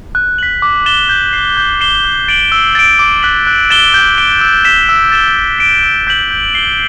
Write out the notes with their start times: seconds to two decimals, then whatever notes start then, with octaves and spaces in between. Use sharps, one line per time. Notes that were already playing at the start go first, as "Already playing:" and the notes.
0.15 F#6
0.38 B6 F#7
0.62 D6
0.86 A6 E7 G7
1.09 G6
1.33 C7 E7
1.57 G6
1.81 C7 E7 G7
2.04 F#6
2.28 A6 D7 F#7
2.52 E6
2.75 A6 D7
2.99 D6
3.22 F#6 B6 F#7
3.47 F#6
3.70 A6 E7 G7
3.94 G6
4.18 D7 G7
4.41 E6
4.65 B6 E7 G7
4.89 E6
5.12 A6 E7 G7
5.36 E6
5.59 B6 D7
5.83 E6
6.07 G6 B6 F#7
6.31 G6
6.55 C7 G7